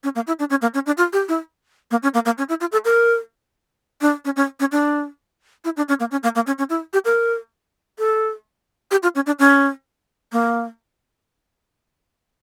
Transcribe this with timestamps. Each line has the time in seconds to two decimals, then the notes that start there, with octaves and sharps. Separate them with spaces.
0.04 C#4
0.15 A#3
0.27 E4
0.39 D4
0.50 C#4
0.62 A#3
0.74 C#4
0.86 D4
0.97 F4
1.13 G4
1.28 E4
1.91 A#3
2.03 C#4
2.14 A#3
2.25 A#3
2.38 C#4
2.49 E4
2.60 F4
2.72 A4
2.85 A#4
4.01 D4
4.25 C#4
4.36 C#4
4.60 C#4
4.72 D4
5.64 E4
5.77 D4
5.88 C#4
6.00 A#3
6.11 C#4
6.23 A#3
6.35 A#3
6.47 C#4
6.58 C#4
6.70 E4
6.93 G4
7.05 A#4
7.99 A4
8.91 G4
9.03 F4
9.15 C#4
9.26 D4
9.39 C#4
10.32 A#3